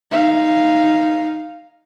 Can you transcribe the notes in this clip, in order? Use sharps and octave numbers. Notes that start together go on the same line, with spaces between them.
D#4 F5